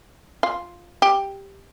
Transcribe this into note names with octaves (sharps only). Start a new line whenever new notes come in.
F4
G4